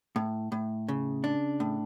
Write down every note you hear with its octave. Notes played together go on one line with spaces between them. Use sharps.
A2
A2
C#3
D4
A2